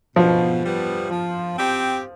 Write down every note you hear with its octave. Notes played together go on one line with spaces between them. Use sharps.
B2 F3
G3 B3
F3
C4 G4